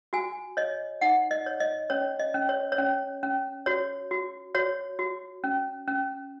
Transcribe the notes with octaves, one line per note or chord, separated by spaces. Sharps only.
F#4 G#5
C#5 D#5
D#4 F#5
D#5
C#5
D#5
C#4 C#5
D#5
C#4
C#5
C#5
C#4
C#4
F#4 C#5
F#4
F#4 C#5
F#4
C#4
C#4